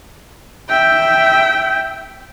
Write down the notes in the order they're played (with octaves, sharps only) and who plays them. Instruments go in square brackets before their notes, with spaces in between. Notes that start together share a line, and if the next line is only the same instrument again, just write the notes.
[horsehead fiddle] E5 G5